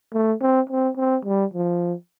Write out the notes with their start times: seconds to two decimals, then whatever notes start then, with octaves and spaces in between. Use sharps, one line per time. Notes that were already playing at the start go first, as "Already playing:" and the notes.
0.13 A3
0.41 C4
0.69 C4
0.97 C4
1.25 G3
1.54 F3